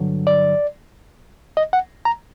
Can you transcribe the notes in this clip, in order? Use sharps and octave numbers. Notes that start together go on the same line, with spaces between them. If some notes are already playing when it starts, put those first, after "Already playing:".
Already playing: G2 D3 F#3
D5
D#5
F#5
A#5